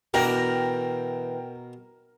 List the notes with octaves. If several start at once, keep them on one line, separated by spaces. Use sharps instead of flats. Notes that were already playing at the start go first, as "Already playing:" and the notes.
B2 E3 D4 A#4 G5